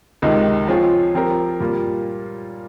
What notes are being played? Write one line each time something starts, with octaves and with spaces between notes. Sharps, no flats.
C#2 C3 D#3 G#3 D#4
F3 C4 F4 G#4 C#5
F3 C4 G4 A#4
A#2 G3 A#3 F4